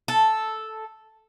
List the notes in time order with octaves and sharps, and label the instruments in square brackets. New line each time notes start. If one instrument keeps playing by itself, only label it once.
[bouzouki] A4